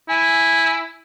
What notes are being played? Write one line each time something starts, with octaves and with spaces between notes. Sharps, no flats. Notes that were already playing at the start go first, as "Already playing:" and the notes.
E4 G#5